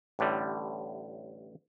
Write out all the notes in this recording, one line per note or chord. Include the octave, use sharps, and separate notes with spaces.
A1 A2 D3 G3